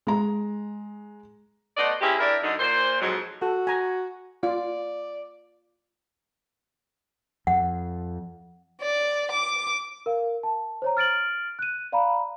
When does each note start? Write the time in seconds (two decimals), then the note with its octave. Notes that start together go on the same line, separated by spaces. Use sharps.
0.07 G#3 A#5
1.77 A3 B3 C5 D5 D#5
2.01 A#3 C4 C#4 E4 G4 G#4
2.19 D4 E4 G4 A#4 D5 E5
2.42 F#2 D3 D#4
2.59 A#2 C5
3.01 F2 G#2 F#3
3.42 F#4 A4
3.67 G#5 A#5
4.43 F4 D5
7.47 F2 F#5
8.81 D5
9.31 D6
10.06 A#4 F5
10.43 A5
10.82 C5 C#5 A#5
10.97 F6 A6 D7 F#7
11.59 F#6 D#7
11.92 D5 F5 A#5 B5